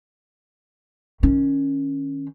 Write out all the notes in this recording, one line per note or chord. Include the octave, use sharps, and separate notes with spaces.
D#3 C#4